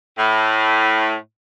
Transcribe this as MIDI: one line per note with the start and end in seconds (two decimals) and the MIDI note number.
0.18 1.14 45